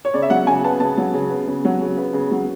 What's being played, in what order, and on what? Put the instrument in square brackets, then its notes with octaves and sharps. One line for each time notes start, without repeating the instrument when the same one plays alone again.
[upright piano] C#5
C#3 D5
E5
F#3 F#5
C#3 G#5
B3 A5
C#3 A5
F#3
C#3
B3
C#3
F#3
C#3
B3
C#3
F#3